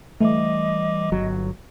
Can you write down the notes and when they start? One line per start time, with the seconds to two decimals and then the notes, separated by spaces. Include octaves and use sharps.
0.21 E3 G3 A3 D#5 D6
1.12 G1 F#3